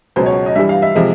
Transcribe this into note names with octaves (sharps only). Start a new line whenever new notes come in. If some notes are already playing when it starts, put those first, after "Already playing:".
C#2 B2 F#3 C5
C#5
D#5
G2 E3 G3 E5
F5
E5
C3 F3 G#3 E5